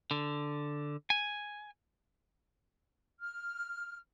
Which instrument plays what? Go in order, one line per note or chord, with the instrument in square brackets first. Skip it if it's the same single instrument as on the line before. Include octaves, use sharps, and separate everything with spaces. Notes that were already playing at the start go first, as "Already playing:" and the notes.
[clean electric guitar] D3
G#5
[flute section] F6